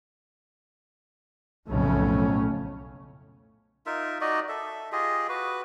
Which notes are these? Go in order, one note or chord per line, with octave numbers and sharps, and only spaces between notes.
B1 F2 A2 C#3 A3 C#4
D#4 F4 A#4 E5
D#4 F#4 D5 D#5
A4 E5
F4 G4 G#4 D#5
F#4 B4